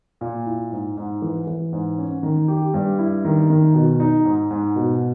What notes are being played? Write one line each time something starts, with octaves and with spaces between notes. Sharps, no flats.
A#2
E4
G#2
G#2
E3
E3
G#2
C#4
D#3
G4
G2
E4
D#3
D#3
B2
D#4
G#2
G#2
B2